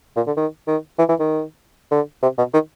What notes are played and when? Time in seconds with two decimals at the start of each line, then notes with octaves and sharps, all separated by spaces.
0.16 A#2
0.27 D3
0.37 D#3
0.67 D#3
0.98 E3
1.09 E3
1.20 D#3
1.91 D3
2.23 C3
2.38 B2
2.53 D#3